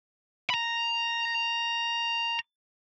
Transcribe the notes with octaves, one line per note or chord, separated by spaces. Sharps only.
A#5 B5